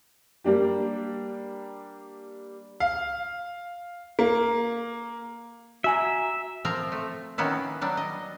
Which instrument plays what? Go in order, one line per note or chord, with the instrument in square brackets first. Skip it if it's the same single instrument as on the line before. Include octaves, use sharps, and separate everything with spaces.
[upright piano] G3 A#3 D4 G4
[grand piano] F5
A#3
[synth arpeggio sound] F#4 G#5 A#5 [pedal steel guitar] E5
[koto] F3 C4 A#4 A#5
A3
D#3 A#3 B3 C#4 E4
F#3 G3 D4
D#5